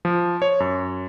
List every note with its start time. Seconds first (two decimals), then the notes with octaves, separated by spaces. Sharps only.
0.05 F3
0.42 C#5
0.60 F#2